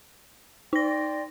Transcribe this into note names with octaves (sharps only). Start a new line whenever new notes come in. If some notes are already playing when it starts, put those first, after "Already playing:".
D#4 D5 G5 C6 A#6